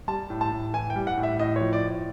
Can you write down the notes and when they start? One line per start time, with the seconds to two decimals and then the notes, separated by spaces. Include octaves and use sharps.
0.08 G3 A5
0.30 A2
0.41 A5
0.52 A2
0.73 E3 G#5
0.90 G5
0.96 G3
1.07 F#5
1.17 A2
1.23 E5
1.39 A2 D#5
1.56 C#5
1.61 F3
1.73 D5
1.84 A2